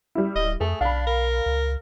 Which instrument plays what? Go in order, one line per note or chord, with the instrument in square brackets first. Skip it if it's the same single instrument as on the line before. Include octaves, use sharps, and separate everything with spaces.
[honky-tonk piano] G3 E4
[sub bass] D1 [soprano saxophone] D#5
[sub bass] F2 [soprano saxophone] A3 [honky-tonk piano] G#4
[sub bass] B1 [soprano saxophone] D4 [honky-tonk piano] F5 B5
[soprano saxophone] A#4
[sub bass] C#2